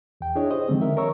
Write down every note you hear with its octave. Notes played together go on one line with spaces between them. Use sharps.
E2 G5
D4 E4 G#4 C#5 D#5
G4 C5 D#5
D3 D#3 F3 G#3 C4
A#4 E5
A#4 C#5 A#5 C#6 E6